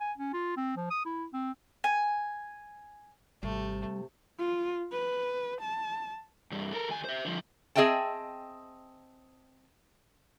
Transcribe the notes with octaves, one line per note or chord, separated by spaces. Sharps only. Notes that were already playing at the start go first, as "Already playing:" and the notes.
G#5
C#4
F4
C4
F3
D#6
E4
C4
G#5
G#1 C3 G3 A3
F4
B4
A5
C2 G2
A4 A#4
D#2 G#5
C5 E5
D3 F3
C4 G#4 D#5 E5 G5 A5